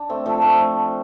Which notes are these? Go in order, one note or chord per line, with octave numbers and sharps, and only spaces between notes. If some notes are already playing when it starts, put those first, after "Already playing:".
Already playing: D4
A3 C4
F3 A3
F3 A3